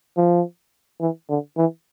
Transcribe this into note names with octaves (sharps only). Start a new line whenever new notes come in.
F3
E3
D3
E3